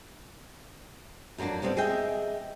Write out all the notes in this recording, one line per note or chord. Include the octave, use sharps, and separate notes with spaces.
F2 F#3 A3 A#3 D4
A2 G3 B3 C4
G#4 D#5 E5 G5